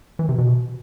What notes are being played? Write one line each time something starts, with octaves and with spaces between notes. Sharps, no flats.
E3
C3
B2